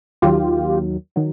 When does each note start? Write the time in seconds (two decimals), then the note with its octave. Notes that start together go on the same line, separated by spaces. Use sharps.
0.22 D#2 D#3 F#3 F4 G4
1.16 D#3 F#3